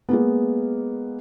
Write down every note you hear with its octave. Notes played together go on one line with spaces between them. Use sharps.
G#3 A#3 B3